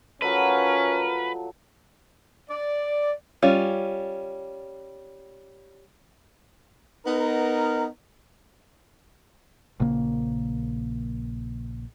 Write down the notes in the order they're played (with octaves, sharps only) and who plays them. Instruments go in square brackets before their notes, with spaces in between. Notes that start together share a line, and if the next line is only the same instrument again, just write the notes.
[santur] F3 F#3 A3 [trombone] C#4 [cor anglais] A#4 [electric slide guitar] B4
[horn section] D5
[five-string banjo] G3 C#4 F4
[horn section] B3 D#4 A#4
[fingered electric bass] A#1 C#3 A#3